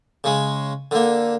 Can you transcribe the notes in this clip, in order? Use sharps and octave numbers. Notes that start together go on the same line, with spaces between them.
C#3 G#3
D3 A#3